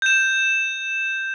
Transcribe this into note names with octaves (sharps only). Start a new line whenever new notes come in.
G6 E7